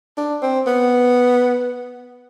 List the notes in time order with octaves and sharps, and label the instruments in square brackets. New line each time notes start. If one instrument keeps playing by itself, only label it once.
[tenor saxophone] D4
C4
B3